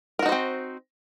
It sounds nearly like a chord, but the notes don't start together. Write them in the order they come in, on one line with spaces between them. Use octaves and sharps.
A#4 F#4 D#4 C5 C4